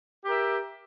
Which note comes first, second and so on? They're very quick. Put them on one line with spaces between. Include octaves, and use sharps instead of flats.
G4 A#4 E5